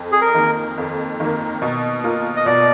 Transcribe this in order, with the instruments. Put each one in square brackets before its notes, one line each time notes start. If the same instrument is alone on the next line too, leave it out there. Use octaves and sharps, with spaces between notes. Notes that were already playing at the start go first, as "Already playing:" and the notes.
Already playing: [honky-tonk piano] F2
[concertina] G#4
A#4
[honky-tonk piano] D#3 A#3
F2
D#3 A#3
B2
A#3 F4
[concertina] D#5
[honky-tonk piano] B2 [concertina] D5